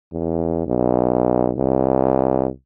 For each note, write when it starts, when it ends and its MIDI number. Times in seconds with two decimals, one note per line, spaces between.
0.12 0.63 40
0.67 1.52 35
1.57 2.48 36